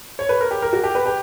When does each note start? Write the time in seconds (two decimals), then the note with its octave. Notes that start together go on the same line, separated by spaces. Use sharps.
0.19 C#5
0.29 B4
0.41 A#4
0.51 G4
0.62 A#4
0.73 F#4
0.84 G4
0.95 B4
1.06 G4